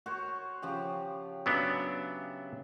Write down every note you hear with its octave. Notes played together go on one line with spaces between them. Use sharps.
F#4 C5 C#5
C#3 F3 G4
C#3 F#3 B3 D4 E5